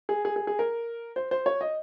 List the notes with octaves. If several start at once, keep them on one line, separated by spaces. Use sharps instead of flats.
G#4
G#4
G#4
G#4
A#4
C5
C5
C#5
D#5